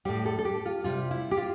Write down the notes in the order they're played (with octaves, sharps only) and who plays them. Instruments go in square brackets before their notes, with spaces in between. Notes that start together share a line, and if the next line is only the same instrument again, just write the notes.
[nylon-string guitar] A2 G3 G4
A4
A4
G4
F4
C3 G3 F4
E4
G4
F4